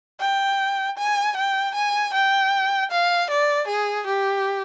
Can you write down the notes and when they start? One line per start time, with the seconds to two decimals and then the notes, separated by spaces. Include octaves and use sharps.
0.20 G5
0.98 G#5
1.37 G5
1.75 G#5
2.14 G5
2.92 F5
3.30 D5
3.68 G#4
4.07 G4